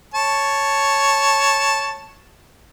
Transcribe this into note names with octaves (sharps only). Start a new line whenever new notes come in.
C#5 A5